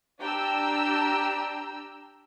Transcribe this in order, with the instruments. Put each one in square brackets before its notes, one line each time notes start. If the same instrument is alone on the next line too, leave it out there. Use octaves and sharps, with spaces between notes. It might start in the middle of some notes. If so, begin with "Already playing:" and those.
[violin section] D4 G4 G5 A#5 E6